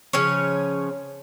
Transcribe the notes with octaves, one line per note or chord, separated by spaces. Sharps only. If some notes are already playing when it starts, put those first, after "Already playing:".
C#3 F3 C#4 C#5